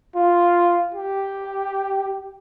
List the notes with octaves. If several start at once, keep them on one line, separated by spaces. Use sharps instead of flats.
F4
G4